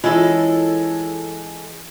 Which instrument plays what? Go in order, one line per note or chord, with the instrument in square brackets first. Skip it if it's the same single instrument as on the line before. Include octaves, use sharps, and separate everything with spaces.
[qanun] E3 C#4 [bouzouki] G#3 A4 [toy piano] F4